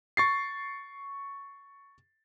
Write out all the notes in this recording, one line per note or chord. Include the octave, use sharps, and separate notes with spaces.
C#6 A6 C7